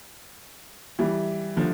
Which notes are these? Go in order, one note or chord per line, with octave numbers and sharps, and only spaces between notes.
E3 G3
D3 F3